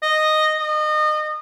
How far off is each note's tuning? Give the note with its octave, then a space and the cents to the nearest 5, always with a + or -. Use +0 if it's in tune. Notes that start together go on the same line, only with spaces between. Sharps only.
D#5 -5
D#5 -30